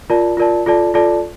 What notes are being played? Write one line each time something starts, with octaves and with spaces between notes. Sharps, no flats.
F4 A#4 D5 A5
F4 A#4 D5 A5
F4 A4 D5 A5
F4 A4 D5 A5